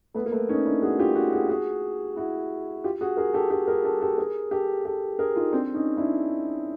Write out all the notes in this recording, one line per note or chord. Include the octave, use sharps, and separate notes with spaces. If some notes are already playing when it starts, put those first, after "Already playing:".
A3 B3
A#3
A3 B3
C#4 D#4
D4 E4
F#4 G#4
F4 G4
E4 F#4
F#4 G#4
F#4 G#4
E4 F#4
F4 G4
F#4 G#4
G#4 A#4
G4 A4
G4 A4
G#4 A#4
G4 A4
G4 A4
G#4 A#4
G4 A4
G4 A4
G#4 A#4
D#4 F4
C4 D4
C#4 D#4
D4 E4